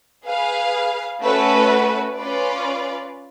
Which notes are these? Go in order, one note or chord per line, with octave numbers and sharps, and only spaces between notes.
G#4 B4 F5
A3 C#4 F#4 B4
C#4 F4 B4 D5